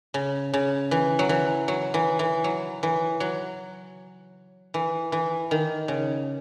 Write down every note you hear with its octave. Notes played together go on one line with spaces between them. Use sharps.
C#3
C#3
E3
F#3
E3
F#3
E3
E3
F#3
E3
F#3
E3
E3
D#3
C#3